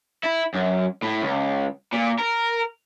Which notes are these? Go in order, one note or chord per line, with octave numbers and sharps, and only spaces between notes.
E4
F#2
A2
C#2
A#2
A#4